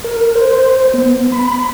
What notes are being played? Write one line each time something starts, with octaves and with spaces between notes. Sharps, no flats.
A#4
C5
B3
B5